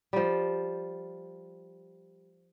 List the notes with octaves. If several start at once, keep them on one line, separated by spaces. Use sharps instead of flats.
F3 G3